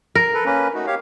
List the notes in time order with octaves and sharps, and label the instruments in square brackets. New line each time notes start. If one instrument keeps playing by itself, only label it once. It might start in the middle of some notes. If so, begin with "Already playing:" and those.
[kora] A#4
[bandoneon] A4 B4
A#3 C#4 B4
A3 D#4 F#4
G4 C#5 F5